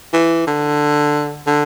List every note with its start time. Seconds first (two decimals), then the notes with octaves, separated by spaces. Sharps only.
0.13 E3
0.47 D3
1.47 D3